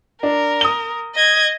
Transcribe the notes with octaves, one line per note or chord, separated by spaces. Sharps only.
D4 A#4
D#6 G7
D#5 G#6